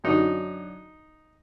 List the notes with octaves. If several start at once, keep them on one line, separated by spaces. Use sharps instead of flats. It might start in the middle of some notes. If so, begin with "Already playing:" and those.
F#2 D3 F#3 D#4